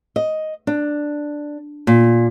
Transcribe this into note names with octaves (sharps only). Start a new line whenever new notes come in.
D#5
D4
A#2